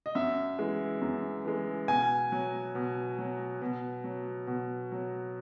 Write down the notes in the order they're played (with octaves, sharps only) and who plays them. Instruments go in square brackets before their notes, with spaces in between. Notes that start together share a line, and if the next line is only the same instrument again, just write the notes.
[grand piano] D#5
F#2 E5
E3 G#3
F#2
E3 G#3
B2 G#5
F#3
B2
F#3
B2
F#3
B2
F#3